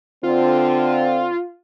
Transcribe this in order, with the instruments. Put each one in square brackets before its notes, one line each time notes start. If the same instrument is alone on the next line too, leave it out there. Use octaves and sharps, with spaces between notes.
[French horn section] D3 C4 [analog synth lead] F4